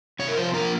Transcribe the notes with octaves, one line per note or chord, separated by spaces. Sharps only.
C3 C#5
A#4
F3 C5
A#3 A#4